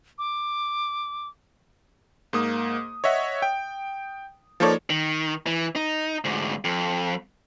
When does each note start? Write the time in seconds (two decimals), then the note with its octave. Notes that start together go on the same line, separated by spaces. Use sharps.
0.18 D6
2.33 G#2 A#3 D#6
3.04 C#5 D#5 E5 F#5
3.42 G5
4.60 F3 A#3 D#4 A4 C#5 D5
4.90 D#3
5.47 E3
5.76 D#4
6.25 D2 G#2
6.65 F2